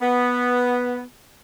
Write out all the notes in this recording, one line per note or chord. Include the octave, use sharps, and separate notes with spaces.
B3